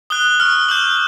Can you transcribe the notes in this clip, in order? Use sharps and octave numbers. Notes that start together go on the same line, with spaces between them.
D#6 F#6 G7
C#6 F6
D6 G6 F#7